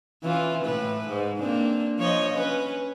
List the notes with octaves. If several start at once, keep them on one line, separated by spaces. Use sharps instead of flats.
E3 C#4 F4
A2 B4
G#2
A#3 C4 D4
F3 C#5 D#5
C#4 B4